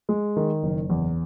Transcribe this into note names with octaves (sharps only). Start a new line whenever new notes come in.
G#3
D#3
F#1
E2